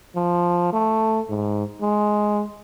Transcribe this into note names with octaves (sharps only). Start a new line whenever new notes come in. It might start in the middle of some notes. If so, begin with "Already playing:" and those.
F3
A3
G#2
G#3